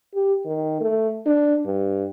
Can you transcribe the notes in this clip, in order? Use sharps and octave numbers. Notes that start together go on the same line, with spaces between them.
G4
D#3
A3
D4
G2